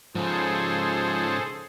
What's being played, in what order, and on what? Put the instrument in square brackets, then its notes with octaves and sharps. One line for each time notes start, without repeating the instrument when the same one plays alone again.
[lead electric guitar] G#2 C#3 [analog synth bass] F3 [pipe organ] G#4 A4 C5